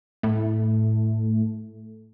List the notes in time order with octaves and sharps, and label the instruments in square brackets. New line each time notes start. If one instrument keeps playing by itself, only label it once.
[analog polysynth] A2 A3